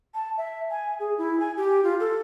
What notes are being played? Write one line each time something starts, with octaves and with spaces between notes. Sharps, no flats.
A5
E5
G#5
G#4
E4
G#5
G4
F4
A4